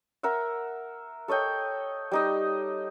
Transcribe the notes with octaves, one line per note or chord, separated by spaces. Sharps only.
A#4 E5 F#5
A4 C#5 D#5 G5
G3 D#4 D#5